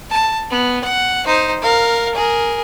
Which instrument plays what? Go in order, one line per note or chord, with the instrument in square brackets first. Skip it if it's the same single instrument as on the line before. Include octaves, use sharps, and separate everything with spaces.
[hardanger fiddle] A5
B3
F#5
D#4 C5
A#4 F5
G#4 A#4